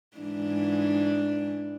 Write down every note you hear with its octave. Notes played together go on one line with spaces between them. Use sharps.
G#2 E3 D4